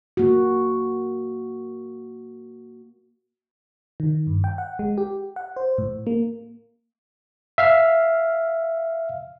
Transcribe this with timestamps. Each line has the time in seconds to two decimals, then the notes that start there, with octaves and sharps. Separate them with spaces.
0.17 A#3 F#4
4.00 D#3
4.27 G2
4.44 G5
4.58 F#5
4.79 G#3
4.98 G4
5.36 F#5
5.56 C5
5.78 A2
6.07 A#3
7.58 E5 F5 F6